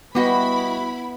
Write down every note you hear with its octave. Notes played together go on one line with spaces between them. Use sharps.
G3 B3 E4 F#4 D#5 B5